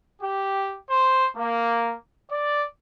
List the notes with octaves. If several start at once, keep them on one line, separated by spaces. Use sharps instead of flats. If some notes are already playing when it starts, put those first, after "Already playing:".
G4
C5
A#3
D5